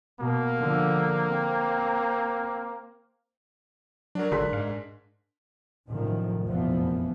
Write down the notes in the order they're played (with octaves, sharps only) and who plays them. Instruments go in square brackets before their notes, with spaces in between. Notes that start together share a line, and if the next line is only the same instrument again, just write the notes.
[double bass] B2 [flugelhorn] A#3
[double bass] D3 F3
C4
[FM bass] F#3 [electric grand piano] D4 A#4
[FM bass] G#1 [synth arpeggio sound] D3 F#3 G#4 [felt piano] C6 F#6 B6
[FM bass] G#2 [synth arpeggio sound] F5
[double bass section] A#1 F#2 A2 C3 D#3 F3
F1 A#1 F#2 E3 F3 B3